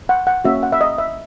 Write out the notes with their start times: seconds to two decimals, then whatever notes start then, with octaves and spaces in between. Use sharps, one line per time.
0.09 F#5
0.27 F#5
0.45 A#3 C#4 F#4 E5
0.63 F#5
0.72 E5
0.81 D#5
0.98 E5